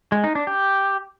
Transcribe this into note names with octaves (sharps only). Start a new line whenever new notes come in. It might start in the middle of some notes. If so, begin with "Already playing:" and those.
G#3
D#4
D4
G4